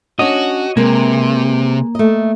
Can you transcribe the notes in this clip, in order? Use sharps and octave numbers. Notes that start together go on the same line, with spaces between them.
C#4 D4 F#4 C#5 D#5
C3 G#3 A#3 A#4 B4
A3 D#5